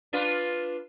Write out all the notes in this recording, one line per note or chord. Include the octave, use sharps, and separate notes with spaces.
D4 F4 B4